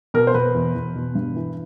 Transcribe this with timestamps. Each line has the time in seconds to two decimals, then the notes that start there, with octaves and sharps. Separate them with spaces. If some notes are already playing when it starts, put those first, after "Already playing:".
0.14 B2 A#4
0.27 C5
0.34 B2 B4
0.54 E2
0.75 E2
0.96 B2
1.15 G2
1.36 E3